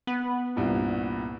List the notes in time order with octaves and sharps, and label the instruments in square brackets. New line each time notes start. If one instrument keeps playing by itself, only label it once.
[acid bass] B3
[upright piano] C2 G2 A#2